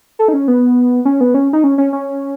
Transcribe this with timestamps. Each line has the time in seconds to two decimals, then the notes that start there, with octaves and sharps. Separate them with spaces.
0.19 A4
0.28 D#4
0.33 C#4
0.48 B3
1.05 C#4
1.21 B3
1.34 C#4
1.53 D#4
1.64 C#4
1.78 C#4
1.93 C#4